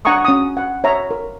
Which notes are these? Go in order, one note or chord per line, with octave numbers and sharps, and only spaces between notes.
D4 F#5 G#5 A#5 C#6 D#6
C#4 D#6
F#5
C#5 E5 A#5
A#4